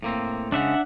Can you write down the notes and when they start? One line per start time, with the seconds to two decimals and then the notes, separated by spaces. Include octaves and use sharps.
0.02 A2 A#3 C4
0.52 C#3 G#3 D4 E5 F#5